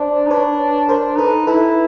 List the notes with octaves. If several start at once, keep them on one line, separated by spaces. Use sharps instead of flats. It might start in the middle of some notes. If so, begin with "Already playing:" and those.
Already playing: D4 C5 D5
D#4
D4 B4 C#5
D4 A#4 C5
D#4 A4 B4
E4 A4 B4